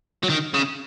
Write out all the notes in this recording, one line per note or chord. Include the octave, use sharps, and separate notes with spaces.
F#3
D#3
C#3